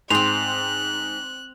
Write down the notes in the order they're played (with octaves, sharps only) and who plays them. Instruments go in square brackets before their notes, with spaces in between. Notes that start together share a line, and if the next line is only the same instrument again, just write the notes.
[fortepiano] G#2 [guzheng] C4 C5 [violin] F#6 [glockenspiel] F7